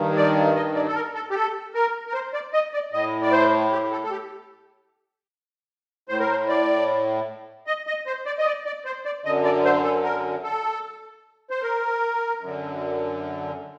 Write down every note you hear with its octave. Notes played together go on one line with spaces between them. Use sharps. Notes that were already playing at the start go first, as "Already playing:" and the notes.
Already playing: G2 D#3
D5
D#5
D5
A4
A#4
A4
G4
A4
A#4
A#4
C5
D5
D#5
D5
A2 D#5
D5
C5
G4
A4
A4
G4
A2 C5
A#4
C5
D5
D#5
D#5
C5
D5
D#5
D5
D5
C5
D5
F#2 D3 D#5
D5
C5
A4
A#4
A4
C5
A#4
F#2 D3